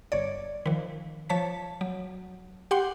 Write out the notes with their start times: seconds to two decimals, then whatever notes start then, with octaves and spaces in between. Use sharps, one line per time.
0.12 G1 C#5 D5
0.66 D#3 F3
1.30 F3 C#5 A5 B6
1.81 F#3
2.71 G4 F#5 G5 C6